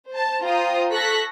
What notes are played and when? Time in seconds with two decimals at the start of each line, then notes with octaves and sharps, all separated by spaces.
0.11 C5 A5
0.44 F4 C5 G5 A#5 D#6
0.93 A4 C#6 F#6 A#6 B6